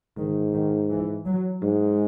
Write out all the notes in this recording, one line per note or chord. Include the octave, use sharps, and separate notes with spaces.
G#2 D#3
D#3
E3
F#3
G#2 G#3